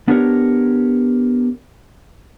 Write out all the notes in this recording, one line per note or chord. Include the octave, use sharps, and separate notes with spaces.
B3 D4 G4 A#4 C#5